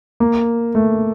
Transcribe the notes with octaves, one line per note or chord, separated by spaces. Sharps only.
A#3
A3